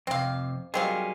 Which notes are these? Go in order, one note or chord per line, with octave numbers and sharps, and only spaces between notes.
F2 C3 C4 F5
D#3 F#3 G3 C4 G#4 F5